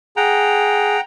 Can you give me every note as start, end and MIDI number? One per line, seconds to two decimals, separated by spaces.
0.17 0.97 68
0.17 1.01 78
0.17 1.01 79
0.17 1.01 82